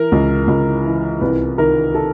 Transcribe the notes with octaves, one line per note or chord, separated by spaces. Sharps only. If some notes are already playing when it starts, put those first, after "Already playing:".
Already playing: E3 A#4
C#2
C#2
E3
C2 B4
D#3 A#4
A4